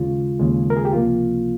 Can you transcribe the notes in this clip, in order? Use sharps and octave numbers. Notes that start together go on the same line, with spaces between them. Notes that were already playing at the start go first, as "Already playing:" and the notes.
Already playing: D#2 C#3 G#3 F4
D#2 C#3 G#3
A#4
G#4
G4
C#2 C3 F3 A#3 F4